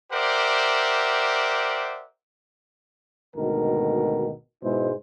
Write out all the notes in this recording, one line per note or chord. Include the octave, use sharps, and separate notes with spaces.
G4 A#4 C5 D5 E5 F#5
G#1 D2 B2 D#3 A#4
G#2 B2 G#3 E4 C5